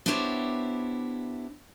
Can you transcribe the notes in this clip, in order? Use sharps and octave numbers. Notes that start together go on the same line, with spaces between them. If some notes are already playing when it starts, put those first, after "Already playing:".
B3 D4 E4 G4 C5 C#5